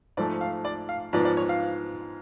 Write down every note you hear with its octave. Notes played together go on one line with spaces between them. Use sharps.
G#2 F3 A3 D5
F5
D5
F5
G#2 F3 B3 F4 B4 D5
D5
C#5
F5